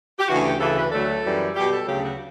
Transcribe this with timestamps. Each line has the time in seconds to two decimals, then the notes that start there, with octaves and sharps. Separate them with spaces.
0.18 G4
0.28 D2 C#3 E3 F#4
0.43 G4
0.59 D2 C#3 E3 A4
0.76 B4
0.91 D2 D3 F#3 A3 A4
1.23 F#2 E3 G3
1.54 B2 G3 G4
1.70 A4
1.86 D2 C#3 F#3 A3 G4
2.02 F#4